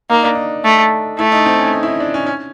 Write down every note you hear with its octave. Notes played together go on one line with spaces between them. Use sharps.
A#3 D#4
D4
D#4
A3
A3 E4
D#4
C4
C#4
D#4
E4
D#4
D4
C#4
C#4